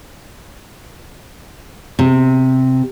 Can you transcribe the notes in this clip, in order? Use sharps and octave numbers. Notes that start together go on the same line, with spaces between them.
C3